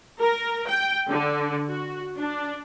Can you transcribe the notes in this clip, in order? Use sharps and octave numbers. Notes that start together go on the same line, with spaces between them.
A#4
G5
D3
F#4
D4